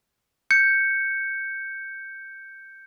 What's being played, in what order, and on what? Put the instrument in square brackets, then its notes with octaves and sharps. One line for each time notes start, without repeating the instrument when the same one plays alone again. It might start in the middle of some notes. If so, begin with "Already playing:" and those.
[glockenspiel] G6 C#7